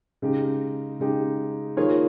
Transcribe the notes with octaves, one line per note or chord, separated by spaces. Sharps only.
C#3 G#3 D#4 G4
C#3 G#3 D#4 G4
D#3 A#3 F4 G#4 C#5